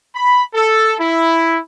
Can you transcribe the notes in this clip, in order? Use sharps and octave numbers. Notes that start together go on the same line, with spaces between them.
B5
A4
E4